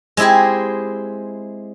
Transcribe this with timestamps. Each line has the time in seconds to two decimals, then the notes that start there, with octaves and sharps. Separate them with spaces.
0.17 G#3 C4 E4 G4 G#4